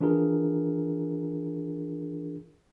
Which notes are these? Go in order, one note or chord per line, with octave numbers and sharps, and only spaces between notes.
E3 D4 F4 G#4 A#4